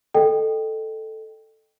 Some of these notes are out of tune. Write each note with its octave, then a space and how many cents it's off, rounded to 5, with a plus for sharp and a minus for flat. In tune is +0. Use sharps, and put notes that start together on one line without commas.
A4 +0 D#5 -20 G5 +0